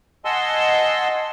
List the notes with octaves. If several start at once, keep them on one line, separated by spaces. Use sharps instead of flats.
D#5 F#5 G#5 A5 C6 E6